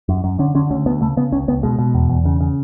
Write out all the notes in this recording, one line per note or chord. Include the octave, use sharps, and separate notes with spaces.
F#2
F#2
D3 C#4
D3 C#4
D2 C#4
D2 B3
C#3 A3
C#3 B3
C#2 C#4
C#2 B3
B2 G#3
B2
E2
E2
C#3
C#3